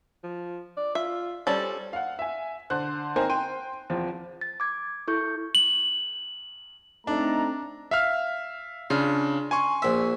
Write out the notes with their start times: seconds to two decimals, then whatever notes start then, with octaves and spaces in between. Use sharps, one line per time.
0.24 F3
0.77 D5
0.95 F4 E5
1.47 G3 C#4 A4 C5
1.93 F5 F#5
2.19 E5 G#5
2.70 D3 C5 F#6
3.16 C4 D#4 A#4 C5 G#5
3.30 G5 C6 D#7
3.90 E2 F3 C4
4.41 A6
4.60 D6 G#6
5.08 E4 A4 C#6 G6
5.55 F#7
7.07 A3 C4 D4 D#4 A4 A#5
7.91 E5 F5 F6
8.90 C#3 D4 F4
9.51 G#5 C6 C#6
9.82 A#1 E5